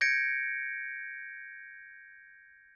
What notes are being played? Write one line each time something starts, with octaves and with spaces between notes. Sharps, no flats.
G6 G#6 A#6 C#7 D7